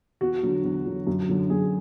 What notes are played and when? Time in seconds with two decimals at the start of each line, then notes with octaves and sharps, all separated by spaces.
0.21 E2 F#4
0.43 D3 F#3
0.64 E2
0.86 D3 F#3
1.07 F#2
1.29 D3 F#3
1.50 F#2 G#4